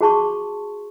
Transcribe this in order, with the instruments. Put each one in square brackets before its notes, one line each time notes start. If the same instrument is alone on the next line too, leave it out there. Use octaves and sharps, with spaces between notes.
[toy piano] F#4 G#4 A5 C6 C#6